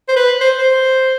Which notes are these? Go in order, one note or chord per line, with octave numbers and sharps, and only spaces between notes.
C5
B4
C5
C5